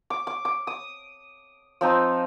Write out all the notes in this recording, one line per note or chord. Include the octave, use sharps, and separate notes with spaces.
D6
D6
D6
D#6
F3 C4 D#4